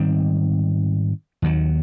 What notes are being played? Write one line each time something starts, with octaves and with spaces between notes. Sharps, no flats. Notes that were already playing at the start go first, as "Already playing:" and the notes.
Already playing: G#2 D#3 G3 C4
D#2 D#3 F#3